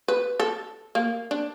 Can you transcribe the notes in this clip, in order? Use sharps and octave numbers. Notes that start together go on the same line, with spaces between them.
B4
A4
A#3
D4